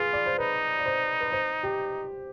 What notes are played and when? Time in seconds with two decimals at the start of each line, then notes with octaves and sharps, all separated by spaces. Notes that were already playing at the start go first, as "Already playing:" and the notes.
Already playing: F4 G#4 B4
0.13 D5
0.26 C5
0.38 D#4 B4
0.79 D5
0.86 C5
1.21 B4
1.32 C5
1.63 G4